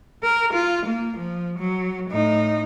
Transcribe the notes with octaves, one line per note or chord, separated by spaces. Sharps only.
A#4
F4
A#3
F3
F#3
A2 D#4